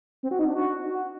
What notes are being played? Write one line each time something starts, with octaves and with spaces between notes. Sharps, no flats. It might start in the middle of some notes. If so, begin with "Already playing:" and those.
C4
F#4
D#4
D4
F#4